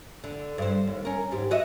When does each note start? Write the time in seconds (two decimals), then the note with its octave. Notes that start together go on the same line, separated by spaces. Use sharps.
0.24 D3
0.58 G2 C5
0.87 D#2
1.05 C#4 A#4
1.31 D#2 G#2 G4
1.51 F#4 D#5 E5